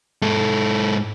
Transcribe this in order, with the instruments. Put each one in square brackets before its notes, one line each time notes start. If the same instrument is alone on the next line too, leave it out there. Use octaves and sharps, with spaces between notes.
[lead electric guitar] G#2 A4